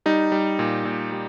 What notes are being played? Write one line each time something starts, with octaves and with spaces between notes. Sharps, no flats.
G3 D#4
G3
A#2
A#2
G3